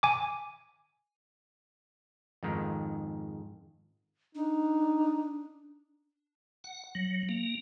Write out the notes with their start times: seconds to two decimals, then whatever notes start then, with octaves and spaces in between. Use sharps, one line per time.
0.03 G#5 D6
2.43 F2 G#2 D#3
4.35 D4 D#4
6.64 F#5
6.95 F#3
7.29 A#3